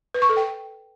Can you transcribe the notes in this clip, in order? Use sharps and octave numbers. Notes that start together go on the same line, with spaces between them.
B4
C#6
A4
G5